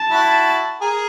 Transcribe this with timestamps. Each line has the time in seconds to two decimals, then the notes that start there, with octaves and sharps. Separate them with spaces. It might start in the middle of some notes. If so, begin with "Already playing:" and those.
Already playing: A5
0.10 E4 F#4
0.81 G#4 A#4